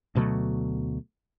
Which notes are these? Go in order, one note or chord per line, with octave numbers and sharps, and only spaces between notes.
D2 B2 F#3 A3